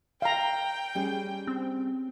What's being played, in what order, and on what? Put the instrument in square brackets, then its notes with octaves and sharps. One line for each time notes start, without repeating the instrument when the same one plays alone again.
[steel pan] F5 A#5 [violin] G5
[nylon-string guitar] G3 C#4 G#4
[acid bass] C4